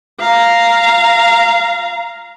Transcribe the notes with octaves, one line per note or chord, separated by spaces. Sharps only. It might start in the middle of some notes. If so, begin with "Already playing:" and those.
F5 A#5